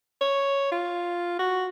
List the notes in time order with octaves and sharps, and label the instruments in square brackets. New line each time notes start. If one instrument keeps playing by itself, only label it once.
[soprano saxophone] C#5
F4
F#4